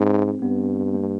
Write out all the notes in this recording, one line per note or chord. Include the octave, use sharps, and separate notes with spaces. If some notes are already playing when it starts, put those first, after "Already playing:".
Already playing: G#2 C4
G2 B3
A#3